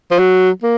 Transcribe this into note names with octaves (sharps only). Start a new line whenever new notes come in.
F3
F#3
A#3